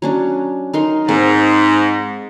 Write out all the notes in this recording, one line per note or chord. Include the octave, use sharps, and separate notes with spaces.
F#3 C#4 D4
D#4 A#4 C6
G#2 G#3 C4 A#4